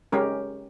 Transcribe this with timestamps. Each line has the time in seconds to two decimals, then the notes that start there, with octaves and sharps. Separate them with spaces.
0.12 G#3 C#4 G4 A#4